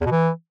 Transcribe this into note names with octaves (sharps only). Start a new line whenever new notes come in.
E2
B2
E3